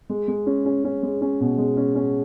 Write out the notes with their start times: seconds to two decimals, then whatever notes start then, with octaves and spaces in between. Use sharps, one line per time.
0.09 G#3
0.28 G#3
0.47 C#4
0.65 C#4
0.84 C#4
1.03 G#3
1.21 C#4
1.40 B2
1.58 G#3
1.77 C#4
1.95 C#4